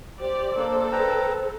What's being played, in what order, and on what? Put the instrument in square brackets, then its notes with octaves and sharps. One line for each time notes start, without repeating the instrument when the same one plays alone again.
[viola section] G4 D5 [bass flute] C5
[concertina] A#3 D4 [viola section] A4
[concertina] B4 G5 A#5